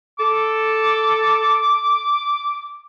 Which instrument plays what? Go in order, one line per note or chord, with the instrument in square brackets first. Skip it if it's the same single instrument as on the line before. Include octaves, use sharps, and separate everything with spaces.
[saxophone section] A4 [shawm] D6